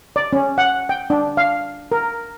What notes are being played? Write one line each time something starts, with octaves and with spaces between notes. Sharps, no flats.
D5
C#4
F#5
G5
D4
F5
A#4